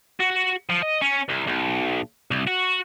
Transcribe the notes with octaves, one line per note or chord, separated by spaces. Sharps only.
F#4
F3
D#5
C#4
C2
B1
C2
F#4